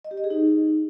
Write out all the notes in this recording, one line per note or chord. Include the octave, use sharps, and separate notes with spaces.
D#5
G4
D#5
G#4
D#4